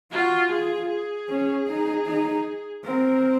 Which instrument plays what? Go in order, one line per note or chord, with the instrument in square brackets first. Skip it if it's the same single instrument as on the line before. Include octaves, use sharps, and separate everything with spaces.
[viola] F4 [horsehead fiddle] F#4
[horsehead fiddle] F4 [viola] G#4
[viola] G#4
[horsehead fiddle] C#4
D#4
D#4
[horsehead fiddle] C4 [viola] A#4